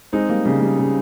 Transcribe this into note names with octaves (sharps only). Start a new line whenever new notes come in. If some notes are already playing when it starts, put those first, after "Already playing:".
G#3 C4 D#4
G3 A#3
C#3 G3
G3
C#3